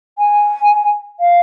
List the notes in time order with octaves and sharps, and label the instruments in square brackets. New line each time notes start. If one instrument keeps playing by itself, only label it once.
[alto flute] G#5
F5